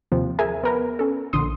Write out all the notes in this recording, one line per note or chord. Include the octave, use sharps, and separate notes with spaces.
D#2 C3 F3
G#4 A#4 E5 G#5
B3 A#4 B4
C#4 A4
A#1 D3 C6 D#6